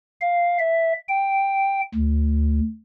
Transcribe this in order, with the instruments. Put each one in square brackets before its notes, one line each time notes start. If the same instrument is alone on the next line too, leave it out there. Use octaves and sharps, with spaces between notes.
[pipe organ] F5
E5
G5
D2